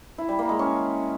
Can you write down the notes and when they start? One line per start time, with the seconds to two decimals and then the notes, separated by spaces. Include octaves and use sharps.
0.18 E4
0.29 G3
0.39 A#3
0.49 G#3
0.59 C#4